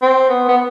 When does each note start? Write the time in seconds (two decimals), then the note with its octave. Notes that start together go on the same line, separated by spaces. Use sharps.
0.02 C4
0.29 B3
0.49 B3